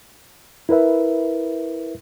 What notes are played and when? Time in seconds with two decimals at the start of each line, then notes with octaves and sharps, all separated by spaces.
0.69 E4 A#4 B4 E5